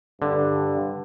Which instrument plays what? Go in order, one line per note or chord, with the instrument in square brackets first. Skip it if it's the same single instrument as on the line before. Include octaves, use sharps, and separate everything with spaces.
[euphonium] G2 [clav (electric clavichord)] D3